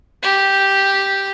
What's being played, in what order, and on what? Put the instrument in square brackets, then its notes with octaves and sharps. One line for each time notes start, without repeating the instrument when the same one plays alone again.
[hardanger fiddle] G4